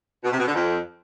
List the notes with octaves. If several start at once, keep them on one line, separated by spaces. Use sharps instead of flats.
B2
C3
B2
D3
F2